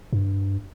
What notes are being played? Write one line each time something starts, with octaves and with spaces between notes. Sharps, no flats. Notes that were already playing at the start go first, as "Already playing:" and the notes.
G2